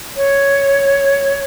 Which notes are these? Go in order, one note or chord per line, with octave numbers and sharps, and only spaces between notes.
C#5